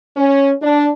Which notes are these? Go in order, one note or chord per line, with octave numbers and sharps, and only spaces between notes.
C#4
D4